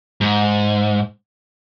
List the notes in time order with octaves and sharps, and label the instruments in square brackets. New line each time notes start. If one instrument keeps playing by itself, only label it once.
[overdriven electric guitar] G#2